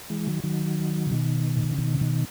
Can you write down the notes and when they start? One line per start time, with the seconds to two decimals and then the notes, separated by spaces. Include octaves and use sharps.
0.10 E3 G#3
0.27 D#3 F#3
0.44 D#3 F#3
1.07 C#3
1.11 B2 D#3
1.56 A#2
1.64 B2
1.72 C#3
1.78 B2 D#3
1.94 C#3
2.01 B2 D#3